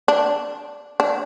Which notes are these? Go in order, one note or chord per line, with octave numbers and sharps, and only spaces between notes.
D4
D4